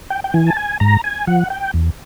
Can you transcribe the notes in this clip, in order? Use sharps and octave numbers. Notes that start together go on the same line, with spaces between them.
G5
G5
E3 G#5
A5
G#5
G#2 A#5
G#5
F3 F#5
G5
E2